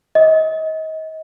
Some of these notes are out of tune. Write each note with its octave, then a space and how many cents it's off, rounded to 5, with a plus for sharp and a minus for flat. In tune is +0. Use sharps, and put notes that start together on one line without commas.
D#5 +30